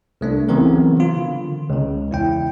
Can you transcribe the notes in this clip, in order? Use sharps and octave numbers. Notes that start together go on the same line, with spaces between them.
C2 A3 D4
C#3 E3 F#3 B3 C4 A#4
F4
D3
C#2 C#3
E2 E4 G5